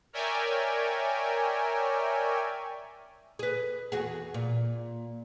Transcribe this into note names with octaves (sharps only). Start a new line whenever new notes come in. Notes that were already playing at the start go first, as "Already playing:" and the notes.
A#4 C#5 D5 E5 G5 G#5
G#4 B4
E2 F#4 G#4
A#2